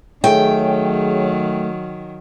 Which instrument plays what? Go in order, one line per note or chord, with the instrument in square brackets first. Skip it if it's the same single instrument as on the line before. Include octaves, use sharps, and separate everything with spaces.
[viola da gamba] D#3 F#3 [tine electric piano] A3 [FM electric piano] G#4 C#5 [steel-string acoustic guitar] G5